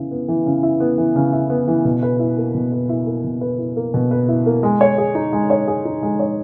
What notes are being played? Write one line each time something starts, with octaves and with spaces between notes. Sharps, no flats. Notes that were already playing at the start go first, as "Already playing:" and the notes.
Already playing: C#3 E3 B3 E4
B3
E3
C#3
E4
B3
E3
C#3
E4
B3
E3
B2
B4
E4
A#3
B2
B4
E4
A#3
B2
B4
E4
A#3
B2
B4
E4
A#3
G#3
C#5
G#4
D#4
G#3
C#5
G#4
D#4
G#3
C#5